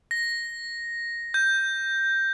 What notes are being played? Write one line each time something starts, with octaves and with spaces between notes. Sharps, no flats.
A#6
G6